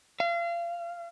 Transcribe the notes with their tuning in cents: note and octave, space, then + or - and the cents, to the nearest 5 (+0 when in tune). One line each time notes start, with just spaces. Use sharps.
F5 -35